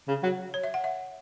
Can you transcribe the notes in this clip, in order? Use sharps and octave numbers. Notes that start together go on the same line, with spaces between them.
C#3
F#3
C#5
E5
F#5
E5